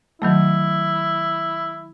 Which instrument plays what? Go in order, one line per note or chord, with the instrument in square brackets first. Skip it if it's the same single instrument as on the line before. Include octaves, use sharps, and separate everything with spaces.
[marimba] D#3 F#3 A3 [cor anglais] E4